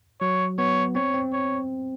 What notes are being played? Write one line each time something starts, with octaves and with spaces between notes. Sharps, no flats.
F#3 C#5
B3 C#5
C4 C#5
C4
C#5